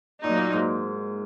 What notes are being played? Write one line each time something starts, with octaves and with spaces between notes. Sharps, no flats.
A#2 F#3 A#3 D#4
A#2
G#2